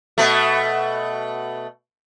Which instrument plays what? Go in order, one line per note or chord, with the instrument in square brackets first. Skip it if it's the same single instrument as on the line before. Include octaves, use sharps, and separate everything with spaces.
[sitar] B2 A3